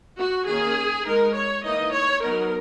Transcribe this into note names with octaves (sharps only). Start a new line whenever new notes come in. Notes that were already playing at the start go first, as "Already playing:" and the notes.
F#4
D#3 A#3 C#4 G#4
G#3 D#4 A#4
C#5
E3 A#3 D#4 D#5
C#5
F#3 B3 D#4 A#4